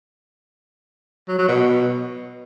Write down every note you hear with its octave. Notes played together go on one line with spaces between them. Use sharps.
F#3
F#3
B2